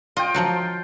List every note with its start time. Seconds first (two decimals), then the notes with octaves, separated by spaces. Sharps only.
0.17 F4 D#5 G5
0.34 F3 F#3 F#4